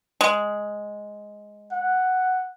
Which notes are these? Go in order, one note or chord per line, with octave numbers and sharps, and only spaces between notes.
G#3
F#5